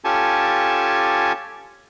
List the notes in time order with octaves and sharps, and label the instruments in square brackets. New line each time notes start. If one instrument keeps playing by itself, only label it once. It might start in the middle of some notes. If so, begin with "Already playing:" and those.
[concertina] C#4 F4 G4 A4 G#5 A5